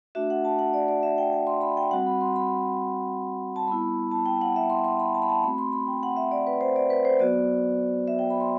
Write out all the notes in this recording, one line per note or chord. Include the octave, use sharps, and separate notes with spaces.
A3 D4 F#4 E5
F#5
A5
F#5
D5
D5
E5
G5
G5
C6
B5
G5
G3 C4 F#4 F#5
B5
C6
B5
A5
G3 B3 E4 B5
A5
G5
F#5
E5
C6
C6
B5
A5
B5
A5
A3 C4 F#4 B5
C6
B5
G5
F#5
E5
D5
B4
C5
D5
B4
C5
F#3 B3 F#4 D5
E5
G5
B5
C6